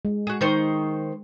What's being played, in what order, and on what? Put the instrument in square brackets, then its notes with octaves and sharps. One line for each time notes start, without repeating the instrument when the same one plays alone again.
[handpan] G#3
[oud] F#4 G#4
[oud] D#3 [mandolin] D#4 C5 C#6